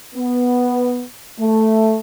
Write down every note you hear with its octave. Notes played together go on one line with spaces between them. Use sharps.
B3
A3